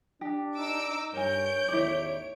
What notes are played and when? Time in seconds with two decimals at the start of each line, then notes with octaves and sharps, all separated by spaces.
0.21 D4 G4
0.56 D#4 D6 E6 D7
1.13 G2 A#4 C#5 G#5 G6 D7
1.68 A1 E2 D#3 E4 D5